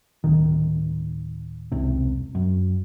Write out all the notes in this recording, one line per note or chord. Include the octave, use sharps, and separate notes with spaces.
D1 D#3
E1 C2 C3
F#2